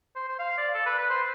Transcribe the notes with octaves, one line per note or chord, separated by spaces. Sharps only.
C5
C5
F5
D5
A4
B4
B4
C5